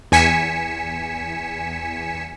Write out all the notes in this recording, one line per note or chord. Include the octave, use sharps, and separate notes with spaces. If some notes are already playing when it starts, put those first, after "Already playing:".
E2 G#5 B6 C#7 E7